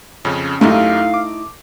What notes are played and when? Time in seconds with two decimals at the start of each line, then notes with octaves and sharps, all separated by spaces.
0.25 F2 C#3 C#4
0.61 F#2 A3 D#4 E4 G4 D#5 F5
1.14 D6